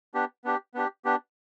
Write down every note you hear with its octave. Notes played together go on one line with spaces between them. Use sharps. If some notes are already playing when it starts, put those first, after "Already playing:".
B3 D4 G4
B3 D4 G4
B3 D4 G4
B3 D4 G4